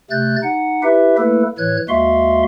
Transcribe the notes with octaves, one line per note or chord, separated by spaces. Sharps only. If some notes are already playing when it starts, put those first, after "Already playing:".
C3 A3 F#6 G6 A6
D#4 F#5
E4 G4 B4 E5
A3 A#3 E4 A4 B4
A2 E3 C#5 F#6 G#6
D#2 G#3 F#4 E5 F5 C6